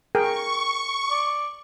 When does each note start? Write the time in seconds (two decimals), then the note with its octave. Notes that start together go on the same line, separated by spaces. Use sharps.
0.15 G#4 A#4 G5 C#6
1.10 D5